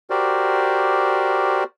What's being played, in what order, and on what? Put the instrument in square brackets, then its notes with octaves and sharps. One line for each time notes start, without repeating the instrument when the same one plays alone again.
[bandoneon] F#4 G4 A#4 C5 D5